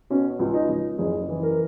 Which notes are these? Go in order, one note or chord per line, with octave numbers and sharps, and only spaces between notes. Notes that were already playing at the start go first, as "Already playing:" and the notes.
B2 C#4
C#2
D#4
C#2
F#1 G#4
E3
A#4